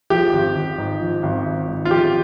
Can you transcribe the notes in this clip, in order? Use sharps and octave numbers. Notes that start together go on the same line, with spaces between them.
F3 G4
G#1
G#1
G#2
F3
G#1
G#1
G#2
F4
F3 G4